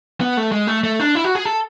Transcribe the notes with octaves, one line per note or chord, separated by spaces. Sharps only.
B3
A3
G#3
A3
A3
D4
E4
F#4
G#4
A4